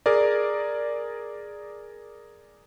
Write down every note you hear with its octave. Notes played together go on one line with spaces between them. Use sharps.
G#4 A#4 D5